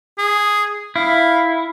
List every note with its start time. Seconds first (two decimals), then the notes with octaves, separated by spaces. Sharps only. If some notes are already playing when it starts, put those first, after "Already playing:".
0.18 G#4
0.96 E4 F5